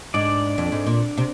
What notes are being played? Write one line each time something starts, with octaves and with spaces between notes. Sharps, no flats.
G#2 D4 D5
F2
G#2
A#2
C3